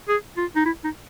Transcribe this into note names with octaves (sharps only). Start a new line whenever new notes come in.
G#4
F4
D#4
E4
D#4